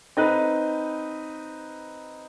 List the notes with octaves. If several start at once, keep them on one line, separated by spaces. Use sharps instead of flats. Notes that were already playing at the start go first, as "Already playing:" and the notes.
C4 D#4 B4